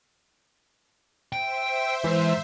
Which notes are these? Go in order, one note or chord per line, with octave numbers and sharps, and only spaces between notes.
C5 E5 G5
G#2 E3